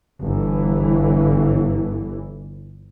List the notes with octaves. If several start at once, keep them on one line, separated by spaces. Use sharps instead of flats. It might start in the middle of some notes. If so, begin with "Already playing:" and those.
G1 E3